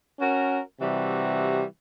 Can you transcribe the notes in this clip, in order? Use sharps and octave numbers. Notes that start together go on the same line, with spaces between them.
C#4 F#4 A#4
C3 E3 G3 F#4